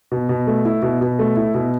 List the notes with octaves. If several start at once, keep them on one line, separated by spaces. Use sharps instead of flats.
B2
B2
A3
E4
B2
B2
A3
E4
B2